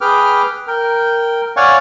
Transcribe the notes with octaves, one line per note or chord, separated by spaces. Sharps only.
G#4 B4 G5 D6 F6
A#4 G5
C#5 D5 F5 F#5 G#5 C#6